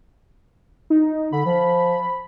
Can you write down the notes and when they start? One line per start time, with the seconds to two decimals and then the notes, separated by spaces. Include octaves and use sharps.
0.90 D#4
1.32 D3 B5
1.46 F3